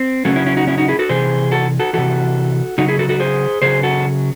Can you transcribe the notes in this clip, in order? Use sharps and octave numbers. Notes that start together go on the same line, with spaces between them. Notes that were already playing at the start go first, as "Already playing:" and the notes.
Already playing: C4
C#3 F#3 A3 C#4
C#4 E4
C#4 E4
D#4 F#4
C#4 E4
D#4 F#4
E4 G#4
F#4 A4
C3 E3 G#4 C5
F#4 A4
F#4 A4
C3 E3 F#4 A4
C#3 F#3 D#4 F#4
E4 G#4
F#4 A4
F#4 A4
G#4 C5
C#3 F#3 G#4 C5
F#4 A4